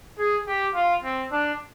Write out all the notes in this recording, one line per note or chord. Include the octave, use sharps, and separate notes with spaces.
G#4
G4
F4
C4
D4